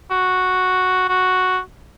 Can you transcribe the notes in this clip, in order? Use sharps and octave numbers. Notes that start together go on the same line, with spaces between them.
F#4
F#4